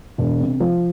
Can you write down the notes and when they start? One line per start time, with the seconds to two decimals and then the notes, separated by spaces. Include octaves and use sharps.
0.18 E1
0.40 C3
0.60 F3